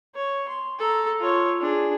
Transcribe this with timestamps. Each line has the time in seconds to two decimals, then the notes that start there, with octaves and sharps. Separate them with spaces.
0.15 C#5
0.48 C6
0.79 A4 A#5
1.20 F4 C#5
1.61 D4 G#4